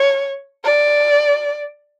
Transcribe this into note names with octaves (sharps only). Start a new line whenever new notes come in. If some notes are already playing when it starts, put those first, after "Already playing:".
Already playing: C#5
D5